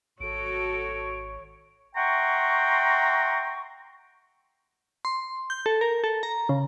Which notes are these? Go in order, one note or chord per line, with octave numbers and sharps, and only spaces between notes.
G#1 F#4 A4 C#5 D7
E5 F#5 G5 A#5 C6 C#6
C6
G6
A4
A#4
A4
A#5
C#3